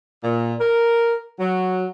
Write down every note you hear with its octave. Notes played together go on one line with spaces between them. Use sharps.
A#2
A#4
F#3